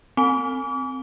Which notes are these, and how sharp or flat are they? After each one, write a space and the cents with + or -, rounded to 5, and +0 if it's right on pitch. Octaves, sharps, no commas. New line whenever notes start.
C4 +0 G#5 +0 D6 -40